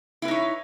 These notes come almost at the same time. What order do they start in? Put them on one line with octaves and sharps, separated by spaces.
E4 B4 D#4 C#5